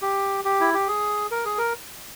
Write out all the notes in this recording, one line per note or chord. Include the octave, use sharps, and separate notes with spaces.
G4
G4
E4
G4
G#4
A#4
G#4
A#4